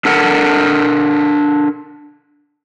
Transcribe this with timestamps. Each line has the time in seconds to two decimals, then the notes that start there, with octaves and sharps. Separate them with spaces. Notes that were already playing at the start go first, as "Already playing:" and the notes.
0.05 D4 A4 A#4 F#5